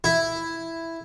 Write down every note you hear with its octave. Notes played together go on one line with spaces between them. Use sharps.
E4